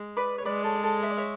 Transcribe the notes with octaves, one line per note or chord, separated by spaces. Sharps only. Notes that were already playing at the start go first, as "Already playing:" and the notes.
Already playing: G#3
B4 D5
C#5
G#3 B4 D5
A4 C#5
D5
A4 C#5
E5
D5
C#5 E5